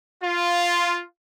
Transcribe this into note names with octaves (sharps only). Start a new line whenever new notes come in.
F4